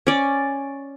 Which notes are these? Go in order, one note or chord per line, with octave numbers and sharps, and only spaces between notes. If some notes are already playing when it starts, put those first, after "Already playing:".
C#4 D5